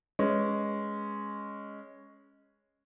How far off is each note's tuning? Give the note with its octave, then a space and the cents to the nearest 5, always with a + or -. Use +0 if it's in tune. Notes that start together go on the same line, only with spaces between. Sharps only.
G#3 +0 C#4 +0 B4 +0